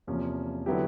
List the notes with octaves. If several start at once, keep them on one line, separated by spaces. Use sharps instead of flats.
E2 C3 F3 A#3 C#4
D3 F#3 B3 E4 G4